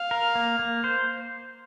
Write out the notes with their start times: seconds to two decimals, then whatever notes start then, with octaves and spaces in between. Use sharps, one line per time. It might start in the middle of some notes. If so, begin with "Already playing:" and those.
Already playing: F5
0.11 A#4
0.35 A#3
0.59 A#3
0.84 C5